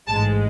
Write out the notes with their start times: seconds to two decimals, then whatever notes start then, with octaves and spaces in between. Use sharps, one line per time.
0.08 A1 G#2 G#3 A5